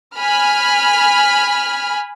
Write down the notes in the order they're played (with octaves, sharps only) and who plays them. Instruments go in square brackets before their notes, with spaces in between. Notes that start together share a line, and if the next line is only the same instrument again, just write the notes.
[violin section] G#5 B5 F6